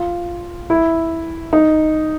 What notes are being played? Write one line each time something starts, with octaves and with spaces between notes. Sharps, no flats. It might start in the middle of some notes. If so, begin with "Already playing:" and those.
Already playing: F4
E4
D#4